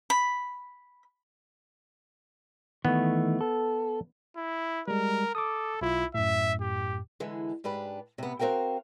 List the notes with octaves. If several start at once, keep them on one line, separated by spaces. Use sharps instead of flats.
B5
D#3 E3 A3 B3
A4
E4
G3 G#3 A#4
A4 D6 D#6
B1 E4 F4
F#2 A2 E5
G4
D3 E3 G#3
G#2 D4 G4 B4
C3 B3
C4 F#4 A#4 F5 G5